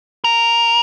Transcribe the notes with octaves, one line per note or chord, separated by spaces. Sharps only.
A#4